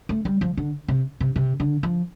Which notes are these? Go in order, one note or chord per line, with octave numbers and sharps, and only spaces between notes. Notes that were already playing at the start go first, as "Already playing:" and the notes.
A3
G3
F3
D3
C3
C3
C3
D3
F3